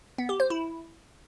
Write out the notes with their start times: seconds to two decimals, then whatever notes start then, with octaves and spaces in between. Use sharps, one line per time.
0.18 B3
0.29 G4
0.40 C5
0.50 E4